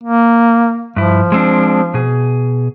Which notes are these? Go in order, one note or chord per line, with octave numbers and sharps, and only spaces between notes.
A#3
G2 F3 E4
G#3 C4 D4
B2 G#4